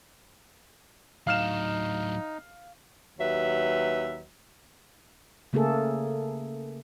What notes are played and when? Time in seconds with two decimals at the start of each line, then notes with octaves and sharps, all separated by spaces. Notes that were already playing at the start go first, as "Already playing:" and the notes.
1.27 A2 F#3 D#4 F5 F6 E7
3.19 D#2 F#3 B4 E5
5.53 C#3 A3 A#3 G#4 A4